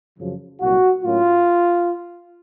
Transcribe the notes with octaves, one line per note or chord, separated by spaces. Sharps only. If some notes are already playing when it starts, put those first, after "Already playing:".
F#2 C#3 F3
C2 A#2 F#3 F#4
A2 F#3 A#3 C#4 F4